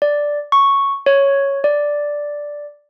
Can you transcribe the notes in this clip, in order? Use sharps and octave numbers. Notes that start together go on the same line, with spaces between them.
D5
C#6
C#5
D5